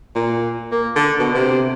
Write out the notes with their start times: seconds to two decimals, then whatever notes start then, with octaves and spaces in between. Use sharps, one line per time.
0.16 A#2
0.71 A#3
0.96 D3
1.19 B2
1.35 C3